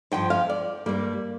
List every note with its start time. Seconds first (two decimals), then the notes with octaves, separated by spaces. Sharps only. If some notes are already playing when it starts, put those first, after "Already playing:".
0.12 G2 F3 G5
0.30 F5
0.49 D5
0.86 G2 G3 A#3